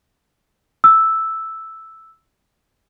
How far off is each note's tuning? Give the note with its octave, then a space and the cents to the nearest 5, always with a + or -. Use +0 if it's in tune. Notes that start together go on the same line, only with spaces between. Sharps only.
E6 -5